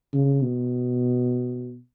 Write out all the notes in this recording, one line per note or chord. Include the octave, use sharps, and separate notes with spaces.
C#3
B2